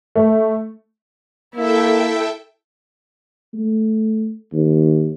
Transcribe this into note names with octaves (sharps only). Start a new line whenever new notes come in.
A3
A#3 E4 A4 E5 G5
A3
D#2